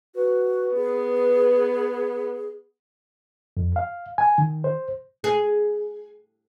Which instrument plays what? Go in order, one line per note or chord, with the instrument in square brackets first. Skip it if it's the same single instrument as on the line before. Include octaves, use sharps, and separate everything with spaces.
[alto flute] F#4 [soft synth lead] B4
[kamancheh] B3 [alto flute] G#4
[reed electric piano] F2
F5
G#5
D#3
C5
[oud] G#4